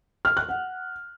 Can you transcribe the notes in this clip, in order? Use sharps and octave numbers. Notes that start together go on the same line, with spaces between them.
F6
F#6
F#5